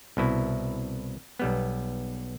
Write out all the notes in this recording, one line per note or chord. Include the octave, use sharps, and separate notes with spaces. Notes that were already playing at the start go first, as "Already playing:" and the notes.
C2 B2 E4
B1 G3 B3